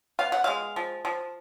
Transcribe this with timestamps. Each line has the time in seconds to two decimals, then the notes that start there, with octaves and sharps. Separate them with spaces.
0.19 B3 F5
0.32 F#5
0.44 G#3 F5
0.76 F3
1.05 F3